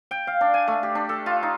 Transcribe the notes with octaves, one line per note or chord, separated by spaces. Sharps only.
G5
F5
D4
G#5
A3
G4
D4
A4
F4
D#4